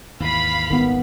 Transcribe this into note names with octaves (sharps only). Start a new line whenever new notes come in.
D#2 G#2 E3 F5 B5
D#1 G#1 D#3 B3